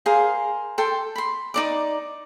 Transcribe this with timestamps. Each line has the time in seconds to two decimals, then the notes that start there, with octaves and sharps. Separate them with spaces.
0.06 G#4 A#4 C5 F5
0.78 A4 G5 C6
1.16 B5 C6
1.54 D#4 D5 D6